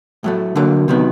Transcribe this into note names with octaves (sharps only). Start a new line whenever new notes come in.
A2 F#3 A3
D2 D3 F#3 A#3
C3 D#3 F#3 B3